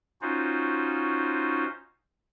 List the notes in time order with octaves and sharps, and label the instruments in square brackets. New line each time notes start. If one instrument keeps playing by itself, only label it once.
[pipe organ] C#4 D#4 F4 F#4 C5